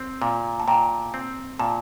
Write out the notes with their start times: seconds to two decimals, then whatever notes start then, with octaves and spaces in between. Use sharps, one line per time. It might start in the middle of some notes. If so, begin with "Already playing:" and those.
Already playing: C4
0.22 A#2
0.60 A5
0.68 A#2 G5 A#5
1.14 C4
1.59 A#2 A5